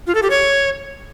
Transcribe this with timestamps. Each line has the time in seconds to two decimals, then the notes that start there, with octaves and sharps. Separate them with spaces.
0.07 F4
0.15 A4
0.23 G4
0.30 C#5